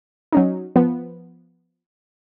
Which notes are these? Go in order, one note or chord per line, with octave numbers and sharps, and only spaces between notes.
F#3 C#4 D#4
F3 B3